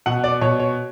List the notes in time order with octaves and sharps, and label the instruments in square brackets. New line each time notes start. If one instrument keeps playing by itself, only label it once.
[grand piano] B2 F#5
D5
B2 C#5
C#5